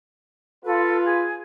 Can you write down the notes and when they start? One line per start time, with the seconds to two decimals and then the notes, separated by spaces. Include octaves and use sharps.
0.65 F4 A4 B4
1.05 G#4